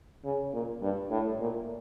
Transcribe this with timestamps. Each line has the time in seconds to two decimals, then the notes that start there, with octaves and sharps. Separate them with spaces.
0.25 C#3
0.53 A#2
0.82 G2
1.11 A2
1.40 A#2